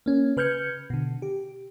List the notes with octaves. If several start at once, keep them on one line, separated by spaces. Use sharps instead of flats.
A#3 C#4
C#3 B4 F6 G6 G#6 C#7
B2 D3
G4